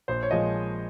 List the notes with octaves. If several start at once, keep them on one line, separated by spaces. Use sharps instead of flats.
A#1 C5
C#5
A#2 F3 G#3 D#5